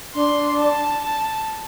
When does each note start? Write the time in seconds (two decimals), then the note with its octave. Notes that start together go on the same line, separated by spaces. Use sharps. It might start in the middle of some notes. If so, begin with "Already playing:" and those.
0.14 D4 C6
0.59 A5
1.04 A5